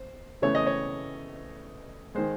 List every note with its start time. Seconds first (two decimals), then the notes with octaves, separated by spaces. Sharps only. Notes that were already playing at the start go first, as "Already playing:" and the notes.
Already playing: C5
0.42 C#3 E3 A3 C#5
0.55 D#5
0.67 C#5
2.15 D#3 G#3 C5